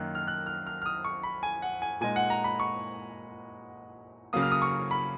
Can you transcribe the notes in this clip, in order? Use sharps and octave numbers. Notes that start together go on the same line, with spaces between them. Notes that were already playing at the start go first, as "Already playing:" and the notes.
Already playing: F#2 D#3 A#3 F#6
F6
F#6
F6
F6
F6
D#6
C#6
B5
G#5
F#5
G#5
A#2 G#3 D#4 G#5
F#5
A#5
B5
C#6
C#3 F#3 A#3 D#6
F6
D#6
C#6
B5